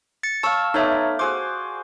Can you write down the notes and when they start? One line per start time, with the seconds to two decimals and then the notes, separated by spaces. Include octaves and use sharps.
0.23 A6 C#7
0.43 C#5 F5 A5 C#6 E6
0.74 A3 B3 D#4 C#5 D5 E5
1.19 F#4 G#4 C5 D6